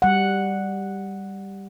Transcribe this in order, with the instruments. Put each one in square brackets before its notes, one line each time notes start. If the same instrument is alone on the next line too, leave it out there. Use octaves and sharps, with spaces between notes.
[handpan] G3 F#5